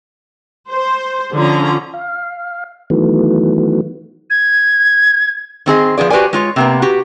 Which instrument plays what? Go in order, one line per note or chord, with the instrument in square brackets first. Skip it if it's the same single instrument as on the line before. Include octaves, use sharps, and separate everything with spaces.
[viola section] C5
D3 F3 C#4 A#5
[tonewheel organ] F5
D#3 E3 F#3 A3 B3
[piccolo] G#6
[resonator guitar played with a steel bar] D#3 C4 G#4 D#5
F3 B3 G#4 D5
F#4 G4 B4 C5 D5 G#5
G#3 F4 C#5
C3 A#3 B3
F#4 G4